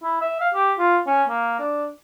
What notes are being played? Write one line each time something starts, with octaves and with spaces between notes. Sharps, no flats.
E4
E5
F5
G4
F4
C#4
A#3
D4